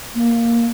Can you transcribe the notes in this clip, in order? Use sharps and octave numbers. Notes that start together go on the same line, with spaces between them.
A#3